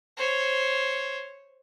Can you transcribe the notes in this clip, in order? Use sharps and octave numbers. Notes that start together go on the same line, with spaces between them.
C5 C#5